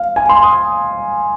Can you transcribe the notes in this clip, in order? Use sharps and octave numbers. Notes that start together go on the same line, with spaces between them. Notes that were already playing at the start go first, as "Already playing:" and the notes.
Already playing: F5
G#5
C6
D#6